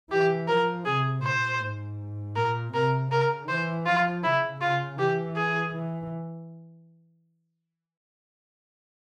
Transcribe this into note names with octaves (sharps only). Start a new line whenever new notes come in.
E3 G4
F3 A#4
C3 G#4
A#2 C5
G#2
A#2 A#4
C3 A#4
C#3 A#4
E3 C5
F3 F4
C#3 E4
C#3 F4
E3 G4
G#4
E3